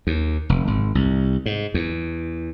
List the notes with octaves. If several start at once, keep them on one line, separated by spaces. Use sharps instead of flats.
D#2
F1
G#1
C2
G#2
E2